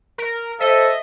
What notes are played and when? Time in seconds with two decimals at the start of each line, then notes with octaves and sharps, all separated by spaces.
0.18 A#4
0.60 A4 C5 D#5 E5